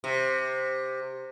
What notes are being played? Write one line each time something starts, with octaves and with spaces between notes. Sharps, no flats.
C3